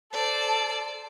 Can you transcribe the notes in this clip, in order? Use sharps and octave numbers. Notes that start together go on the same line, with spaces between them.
A4 C5 D5